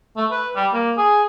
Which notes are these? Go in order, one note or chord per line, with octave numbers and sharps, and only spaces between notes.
A3
B4
G3
A#3
G#4